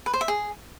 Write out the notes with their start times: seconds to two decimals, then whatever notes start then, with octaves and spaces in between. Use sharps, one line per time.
0.06 B4
0.13 C5
0.21 E5
0.28 G#4